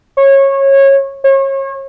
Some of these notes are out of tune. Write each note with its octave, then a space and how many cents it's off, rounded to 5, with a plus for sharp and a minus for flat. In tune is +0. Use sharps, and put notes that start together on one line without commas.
C#5 -20
C#5 -35